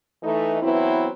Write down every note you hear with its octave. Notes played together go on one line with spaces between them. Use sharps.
E3 A3 D#4
E3 F#3 B3 C4 E4